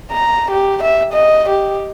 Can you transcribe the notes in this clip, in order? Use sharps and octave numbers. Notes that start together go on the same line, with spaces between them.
A#5
G4
E5
D#5
G4